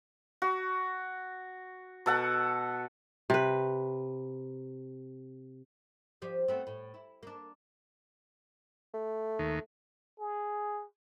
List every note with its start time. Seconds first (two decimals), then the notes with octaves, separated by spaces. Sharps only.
0.42 F#4
2.06 B2 A4 F#5
3.30 C3 B4
6.22 F3 G4 D5
6.48 A3 B3 C4
6.67 A2
6.94 E4
7.23 A#3 D4
8.94 A3
9.39 D#2
10.20 G#4